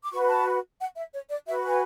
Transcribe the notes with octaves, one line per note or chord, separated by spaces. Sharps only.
D6
F#4 B4 C#6
A5
F#5
E5
C#5
D5
F#4 B4 E5
G#5